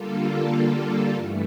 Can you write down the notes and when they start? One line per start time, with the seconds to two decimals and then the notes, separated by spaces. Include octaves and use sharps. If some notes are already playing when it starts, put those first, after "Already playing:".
Already playing: D3 G3 A#3 F4 A4
1.13 G2 E3 A3